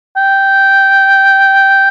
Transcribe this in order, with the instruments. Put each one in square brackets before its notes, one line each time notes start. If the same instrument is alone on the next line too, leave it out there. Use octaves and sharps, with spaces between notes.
[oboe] G5